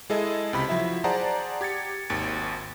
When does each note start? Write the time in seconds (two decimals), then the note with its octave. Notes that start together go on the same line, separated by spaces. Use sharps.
0.10 G#3 E4 G#4 A4 D#5
0.53 C#2 C3 B5 B6
0.69 F3 F#3 E4 E5
1.04 G#4 C5 D5 F#5 A5 A#5
1.61 G4 G#6 A6 C#7
2.10 G#1 D#2 A6 D7